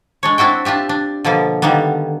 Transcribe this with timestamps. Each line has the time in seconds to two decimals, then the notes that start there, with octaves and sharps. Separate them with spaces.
0.23 G#3 D4 C#5
0.38 C4 D4 E4 F#4 G5
0.65 D4 F4 G4 E5
0.89 D4
1.25 B2 D3 F3 A#3
1.62 D3 D#3 G3 A#3 B3